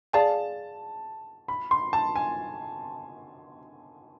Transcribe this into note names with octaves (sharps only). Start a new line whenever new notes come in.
G#4 D5 F5 G#5 A5
B5
C6
A5
G#5